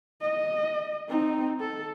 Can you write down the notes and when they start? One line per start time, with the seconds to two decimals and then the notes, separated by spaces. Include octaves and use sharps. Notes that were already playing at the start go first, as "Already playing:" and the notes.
0.21 D#5
1.09 C4 D#4
1.60 A4